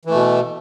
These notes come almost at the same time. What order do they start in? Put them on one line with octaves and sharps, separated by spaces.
E3 A3 B2